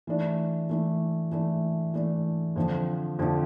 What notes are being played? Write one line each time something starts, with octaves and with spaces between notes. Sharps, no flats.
E3 A3 D4
E3 A3 D4
E3 A3 D4
E3 A3 D4
F2 D3 F3
F2 D3 F3